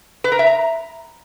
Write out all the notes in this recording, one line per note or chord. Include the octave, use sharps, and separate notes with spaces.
B4
A#4
E5
A#5